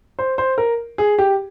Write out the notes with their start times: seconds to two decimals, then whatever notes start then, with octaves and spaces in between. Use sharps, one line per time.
0.19 C5
0.38 C5
0.58 A#4
0.98 G#4
1.19 G4